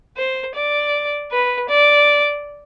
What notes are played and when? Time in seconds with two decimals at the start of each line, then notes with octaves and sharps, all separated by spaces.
0.17 C5
0.55 D5
1.31 B4
1.69 D5